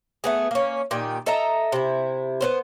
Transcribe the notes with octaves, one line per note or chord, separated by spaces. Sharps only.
A3 B3 G#4
A#3 C#4
A#2 D#3 G4
A4 D#5 E5 A#5
C3 E4
B3 C#4 C5